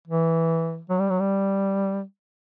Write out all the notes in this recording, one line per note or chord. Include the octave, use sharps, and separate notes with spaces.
E3
F#3
G3
F#3
G3